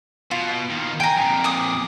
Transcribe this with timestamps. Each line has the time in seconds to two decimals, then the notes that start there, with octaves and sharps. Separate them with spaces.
0.31 B2 F4
0.70 D#3 F3
1.00 G5 G#5 A#5
1.17 F2 A#2
1.44 G#5 D6 D#6